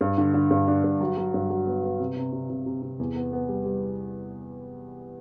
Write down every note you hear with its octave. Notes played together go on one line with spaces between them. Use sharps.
G2
D3
D3
G2
D4
G2
F#3
F#3
G2
F#3
B3
B3
C3
C3
C3
C3
C3
C3
E2
B3
B3
G3
G3